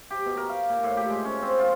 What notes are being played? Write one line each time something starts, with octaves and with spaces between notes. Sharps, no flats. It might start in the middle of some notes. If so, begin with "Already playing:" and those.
G4
B2
A#4
F5
A#2
A2
G4
G#3
C#4
C4
F4